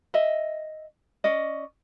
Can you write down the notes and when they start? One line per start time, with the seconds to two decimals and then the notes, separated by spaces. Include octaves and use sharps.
0.14 D#5 E5
1.24 C#4 D5 D#5